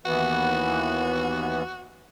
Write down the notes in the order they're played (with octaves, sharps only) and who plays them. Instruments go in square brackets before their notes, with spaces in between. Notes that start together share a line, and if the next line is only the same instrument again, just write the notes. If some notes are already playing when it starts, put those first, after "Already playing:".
[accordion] D#2 E3 B3 [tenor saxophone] F#4